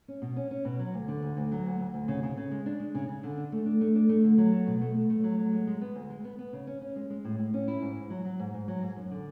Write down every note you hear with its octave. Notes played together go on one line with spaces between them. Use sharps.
C#4
B2
C#4
C#4
B2
F#3
D2
D3
D2
D2
F#3
D2
D2
D2
C#3
C#3
C#3
G#3
D4
G#3
C#3
C#3
D3
D4
A3
D4
A3
D4
A3
D3
F#3
A3
B2
A3
A3
A3
F#3
F#3
G#3
G#3
B3
D2
G#3
B3
B3
C#3
C#4
C#4
G#3
G#3
A2
A2
C#4
E4
G#2
G#2
F#3
F#3
G#2
G#2
F#3
G#2
F#2
D3